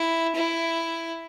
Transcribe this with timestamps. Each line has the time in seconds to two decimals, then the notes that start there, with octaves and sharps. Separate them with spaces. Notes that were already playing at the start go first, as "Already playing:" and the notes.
Already playing: E4
0.35 E4